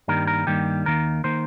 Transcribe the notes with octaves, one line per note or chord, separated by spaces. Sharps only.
G2 D#3 G3 A#3 A#4
A#4
G2 D#3 G3 A#3 G4
D#2 D#3 A#3 A#4
D#3 A#3 C5